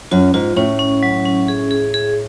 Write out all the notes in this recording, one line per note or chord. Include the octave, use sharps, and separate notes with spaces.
F#2 F4
G#2 F4
A2 C#4
C#4
F#3
C#4
G#4
G#4
G#4